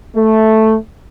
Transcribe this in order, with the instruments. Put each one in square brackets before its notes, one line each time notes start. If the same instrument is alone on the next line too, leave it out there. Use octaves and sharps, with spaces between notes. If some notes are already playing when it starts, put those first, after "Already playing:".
[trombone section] A3